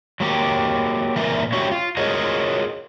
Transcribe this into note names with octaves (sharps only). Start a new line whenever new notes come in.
F#3 A#3 G4
A#2 E3 A#4 E5
C#4 E4 F#4 G4 C#5
F4
F4 F#4 G#4 A#4 C#5 D#5